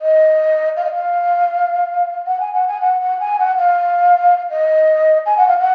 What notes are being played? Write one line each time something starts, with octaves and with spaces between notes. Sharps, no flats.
D#5
F5
D#5
F5
F#5
G#5
F#5
G#5
F#5
F#5
G#5
F#5
F5
D#5
G#5
F#5
F5
F#5